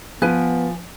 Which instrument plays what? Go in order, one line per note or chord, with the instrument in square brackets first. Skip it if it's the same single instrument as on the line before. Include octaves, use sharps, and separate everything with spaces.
[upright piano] F3 [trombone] B3 [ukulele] B4 G#5